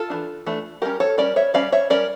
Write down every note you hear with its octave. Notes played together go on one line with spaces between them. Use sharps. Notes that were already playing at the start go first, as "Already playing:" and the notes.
Already playing: F4 A4
E3 A3 D4
E3 A3 D4
G3 C#4 G4 A#4
A4 C#5
G3 C#4 A#4 D5
C#5 E5
G3 C#4 D5 F5
C#5 E5
G3 C#4 A#4 D5